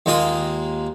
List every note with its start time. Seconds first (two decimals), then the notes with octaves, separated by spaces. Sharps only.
0.06 D#2 G#3 A#3 F4 D#6